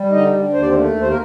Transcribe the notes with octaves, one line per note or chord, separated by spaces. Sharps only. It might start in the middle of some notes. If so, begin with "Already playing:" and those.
Already playing: G3
D3 D#4 D#5
D3
D#2 C5
D5
C4 C5
A3
D#2
C5
A#3 A#4